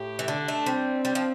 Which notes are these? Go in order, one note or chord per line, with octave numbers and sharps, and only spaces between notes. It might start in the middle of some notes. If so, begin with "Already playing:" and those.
Already playing: A2 G4
E3
D3 D4
A3
G3 C4
G3
F3